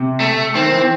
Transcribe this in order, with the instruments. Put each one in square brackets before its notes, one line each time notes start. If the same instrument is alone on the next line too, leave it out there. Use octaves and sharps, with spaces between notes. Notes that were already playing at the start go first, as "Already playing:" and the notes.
Already playing: [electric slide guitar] C3
[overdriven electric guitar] A3
[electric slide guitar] D#3 [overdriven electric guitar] C4
[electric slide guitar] E3